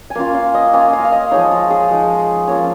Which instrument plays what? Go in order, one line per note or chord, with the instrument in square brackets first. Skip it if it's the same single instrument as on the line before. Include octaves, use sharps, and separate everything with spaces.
[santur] G#5
A#3 C#4 F4 F5
F5
D#5
A#3 C#4 F4 G#5
F5
F5
D#5
F3 G#3 D#4 C#5
F4
G#4
F3 G#3 D#4
F3 A#3 C#4 F4 C#5